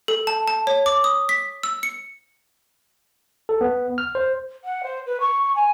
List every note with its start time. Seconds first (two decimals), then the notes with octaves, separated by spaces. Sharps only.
0.08 A4
0.27 A5
0.48 A5
0.67 C#5
0.86 D6
1.04 D#6
1.29 B6
1.63 E6
1.83 C#7
3.49 A4
3.61 B3
3.98 F6
4.15 C5
4.64 F#5
4.83 C5
5.06 B4
5.20 C#6
5.55 G#5